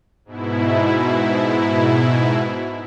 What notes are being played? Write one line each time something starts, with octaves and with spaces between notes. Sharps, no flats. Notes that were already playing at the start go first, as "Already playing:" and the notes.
G#2 B2 E4